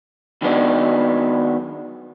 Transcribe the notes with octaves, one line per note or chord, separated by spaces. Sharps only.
D#3 F#3 G#3 B3 D4